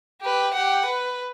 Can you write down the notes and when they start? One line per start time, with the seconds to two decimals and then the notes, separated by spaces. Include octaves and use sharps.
0.21 G4 B4
0.54 G4 F#5
0.85 B4